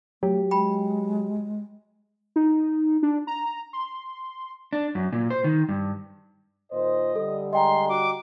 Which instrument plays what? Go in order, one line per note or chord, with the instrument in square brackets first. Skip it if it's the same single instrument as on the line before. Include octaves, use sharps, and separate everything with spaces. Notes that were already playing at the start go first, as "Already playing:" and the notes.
[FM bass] F#3 [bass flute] A3 [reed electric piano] G4
[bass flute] G#3 [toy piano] G5 B5
[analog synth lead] D#4
D4
A#5
C6
[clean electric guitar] D4
F#2
A#2
C5
D#3
G2
[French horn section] A#2 D#3 C5 [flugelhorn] D#5
[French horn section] D3 G3 [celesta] A4
[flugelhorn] G#3 [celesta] D#5 G5 A#5 [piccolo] C6
[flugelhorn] F#4 [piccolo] D6